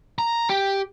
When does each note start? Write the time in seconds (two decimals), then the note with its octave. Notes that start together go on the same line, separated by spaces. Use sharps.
0.19 A#5
0.49 G4